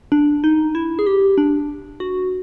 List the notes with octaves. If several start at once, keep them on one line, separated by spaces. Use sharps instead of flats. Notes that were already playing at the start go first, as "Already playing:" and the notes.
D4
D#4
E4
G#4
G4
D4
F#4